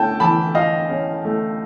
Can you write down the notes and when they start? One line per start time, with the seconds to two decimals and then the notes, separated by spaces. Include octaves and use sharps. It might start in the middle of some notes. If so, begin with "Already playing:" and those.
Already playing: A3 C#4 G5 A5
0.20 E3 A5 B5
0.55 F4 D#5 F5
0.90 C#4
1.25 A3